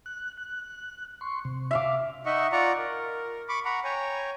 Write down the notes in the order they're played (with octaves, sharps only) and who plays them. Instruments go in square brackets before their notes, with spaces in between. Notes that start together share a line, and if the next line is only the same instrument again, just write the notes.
[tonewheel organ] F#6
F#6
C6 C#6
C3
[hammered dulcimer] E5 F5 D6
[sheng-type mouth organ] D#4 D#5 E5 F#5 C#6
F4 D5 F#5 A#5 C#6
A#4
B5 C#6 D6
F#5 A#5 B5 C#6
C#5 G5 G#5 A#5